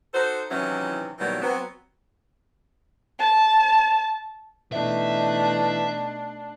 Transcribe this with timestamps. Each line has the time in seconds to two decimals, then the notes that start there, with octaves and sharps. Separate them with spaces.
0.14 D#4 F#4 A4 C5
0.51 C3 D#3 E3 F#3 C#4 E4
1.18 B2 D#3 E3 F#3 G3 A#3
1.42 F#3 B3 C4
3.19 A5
4.72 B2 E3 A3 D4 D#4 E5